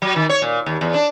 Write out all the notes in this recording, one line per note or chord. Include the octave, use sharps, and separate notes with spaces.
F#3
D#3
C#5
A#2
D#2
E2
D4